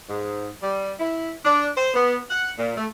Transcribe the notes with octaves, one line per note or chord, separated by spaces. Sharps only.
G#2
G3
E4
D4
C5
B3
F#5
A#2
A3